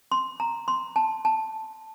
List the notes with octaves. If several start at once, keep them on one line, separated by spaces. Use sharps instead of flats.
C6
A#5
C6
A5
A5